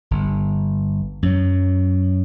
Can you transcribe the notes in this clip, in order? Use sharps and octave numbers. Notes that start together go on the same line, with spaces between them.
G1
F#2 F#3